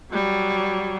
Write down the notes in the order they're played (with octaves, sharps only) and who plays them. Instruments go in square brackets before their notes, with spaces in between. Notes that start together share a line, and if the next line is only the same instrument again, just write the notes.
[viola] F#3 G3